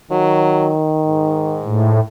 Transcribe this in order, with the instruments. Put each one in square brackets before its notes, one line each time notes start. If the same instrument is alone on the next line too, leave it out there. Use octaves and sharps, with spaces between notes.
[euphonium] D#3 [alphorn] F#3
[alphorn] G#2
[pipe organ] A2